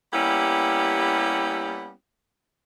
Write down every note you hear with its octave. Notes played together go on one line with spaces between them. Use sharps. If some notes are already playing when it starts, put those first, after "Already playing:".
G3 A#3 B3 C#4 E4 G4